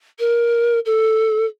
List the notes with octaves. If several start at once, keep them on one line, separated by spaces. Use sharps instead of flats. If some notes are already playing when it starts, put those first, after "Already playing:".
A#4
A4